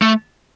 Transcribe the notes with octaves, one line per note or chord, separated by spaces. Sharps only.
A3